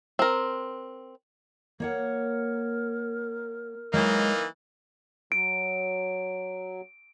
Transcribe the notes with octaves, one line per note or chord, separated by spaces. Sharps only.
C4 A#4
A#3 A#4 C#5 F#5
E3 F#3 G#3 A#3 D#4 C5
F#3 D7